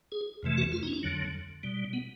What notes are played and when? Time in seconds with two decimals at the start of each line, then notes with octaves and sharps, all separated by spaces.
0.12 G#4
0.43 F2 C3 E3 A3
0.58 F#4
0.72 F4
0.83 D#4
0.88 C#4
0.93 D4
1.03 F2 D3 F#3
1.63 B2 G3
1.93 B3